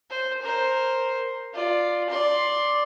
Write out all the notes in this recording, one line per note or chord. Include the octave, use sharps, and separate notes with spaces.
C5
A#4 C5
F4 D5
D5 C6